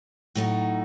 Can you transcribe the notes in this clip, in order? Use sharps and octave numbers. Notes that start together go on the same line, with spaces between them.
A2 F#3 A3 D#4 F#4